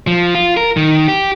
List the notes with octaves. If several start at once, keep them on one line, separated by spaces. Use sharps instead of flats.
F3
F4
A#4
D#3
G4